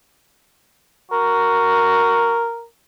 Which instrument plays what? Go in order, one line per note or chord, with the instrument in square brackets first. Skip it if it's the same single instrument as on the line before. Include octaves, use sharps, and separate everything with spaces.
[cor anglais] F#4 [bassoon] A#4